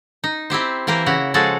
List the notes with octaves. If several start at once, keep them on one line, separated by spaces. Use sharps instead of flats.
D#4
C4 E4 G4 C5
E3 A#3 G4 A#4 C5
C#3 E4 F#4 A#5
F3 G#3 F#4 G#4 A4 A5